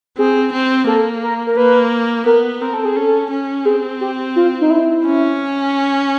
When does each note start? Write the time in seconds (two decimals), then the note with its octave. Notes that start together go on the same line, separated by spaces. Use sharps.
0.18 C4 G#4
0.52 C4
0.87 A#3 A4
1.23 A#4
1.47 A#4
1.57 A#3 B4
2.26 B3 A#4
2.61 C4 A#4
2.74 A4
2.85 G#4
2.96 C#4 A4
3.31 C#4
3.65 C4 G#4
4.01 G4
4.36 F4
4.61 D#4
4.70 E4
5.06 C#4